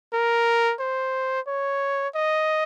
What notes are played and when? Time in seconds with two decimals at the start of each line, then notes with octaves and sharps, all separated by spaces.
0.13 A#4
0.80 C5
1.47 C#5
2.15 D#5